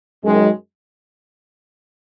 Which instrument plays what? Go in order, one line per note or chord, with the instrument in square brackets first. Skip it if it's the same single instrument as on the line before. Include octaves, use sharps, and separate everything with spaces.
[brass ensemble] F#2 D#3 G#3